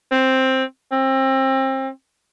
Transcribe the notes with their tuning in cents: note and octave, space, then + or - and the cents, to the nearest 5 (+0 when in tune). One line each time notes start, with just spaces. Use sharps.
C4 +5
C4 +30